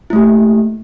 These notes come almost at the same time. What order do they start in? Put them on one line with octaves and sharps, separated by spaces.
E4 A3 G4 A#3